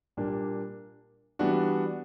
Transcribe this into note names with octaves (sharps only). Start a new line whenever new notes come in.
A#2 G3 A#3 D4
E3 G3 B3 D4 F#4